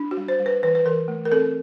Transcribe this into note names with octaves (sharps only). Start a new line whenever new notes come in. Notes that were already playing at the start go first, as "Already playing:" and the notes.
Already playing: D4
F#4
G3
C5
G3
B4
E3 B4
B4
E3 A#4
A3
A#4
C4 A4